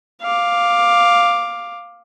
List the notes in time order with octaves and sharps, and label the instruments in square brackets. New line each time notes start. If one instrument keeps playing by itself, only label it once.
[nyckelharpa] F5 D6